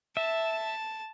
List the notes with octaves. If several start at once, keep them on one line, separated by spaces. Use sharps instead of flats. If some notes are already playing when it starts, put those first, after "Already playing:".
E5 A5